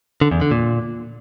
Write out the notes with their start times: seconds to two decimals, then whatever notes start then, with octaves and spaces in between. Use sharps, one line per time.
0.21 D3
0.31 E2
0.41 D3
0.51 A#2